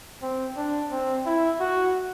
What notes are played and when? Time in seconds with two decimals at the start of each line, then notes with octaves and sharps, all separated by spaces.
0.23 C4
0.57 D4
0.91 C4
1.26 E4
1.60 F#4